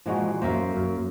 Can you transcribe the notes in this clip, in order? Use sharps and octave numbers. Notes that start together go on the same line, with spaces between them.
A#2 E3 F3 G#3 F#4
F#2 A#3 C5 E5 F5
F#2